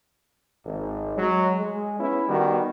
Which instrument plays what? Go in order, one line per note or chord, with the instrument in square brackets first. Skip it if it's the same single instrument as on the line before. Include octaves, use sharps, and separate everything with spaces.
[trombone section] G#1
F#3 G#3
G#3
B3 C#4 E4
D#3 G3 B3 F#4